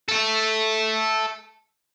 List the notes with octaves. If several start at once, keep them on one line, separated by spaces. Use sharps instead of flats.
A4 E5